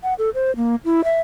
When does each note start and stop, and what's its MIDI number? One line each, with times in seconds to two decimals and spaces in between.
0.03 0.14 78
0.19 0.30 69
0.35 0.55 72
0.56 0.76 58
0.85 1.04 64
1.04 1.20 76